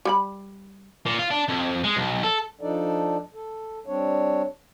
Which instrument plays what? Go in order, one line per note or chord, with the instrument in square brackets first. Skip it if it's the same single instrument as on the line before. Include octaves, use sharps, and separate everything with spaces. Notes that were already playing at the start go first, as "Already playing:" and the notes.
[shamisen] G3 G4 B5
[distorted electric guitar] A#2
F4
D4
F2
G#3
B1
A4
[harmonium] F3 D4 D#4 A4 D5
A4
G3 C4 D4 C#5